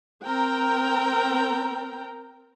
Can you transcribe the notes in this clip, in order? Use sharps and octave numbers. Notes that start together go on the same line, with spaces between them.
C4 A#4 G5 A#5